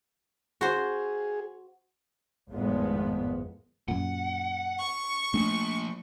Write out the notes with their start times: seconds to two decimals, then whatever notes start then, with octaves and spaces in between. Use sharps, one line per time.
0.61 F#4 G#4 C5
2.51 G#1 F2 A2 F3 G#3 B3
3.88 F#2 A#2 F#5
4.79 C#6
5.34 F3 A3 A#3 D4